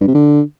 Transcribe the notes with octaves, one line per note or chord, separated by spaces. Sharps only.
G2
C3
D3